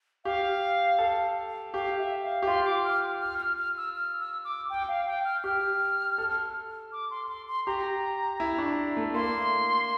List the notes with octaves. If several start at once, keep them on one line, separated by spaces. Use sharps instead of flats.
G4 F5
A4
G4 F5
E5
F5
G4
F4 C6
D6
F6
F6
F6
F6
E6
F6
E6
D6
G5
F5
G5
F6
G4 F6
A4
D6
C6
C6
C6
G4 A#5
E4
D4
A3
A#3 C6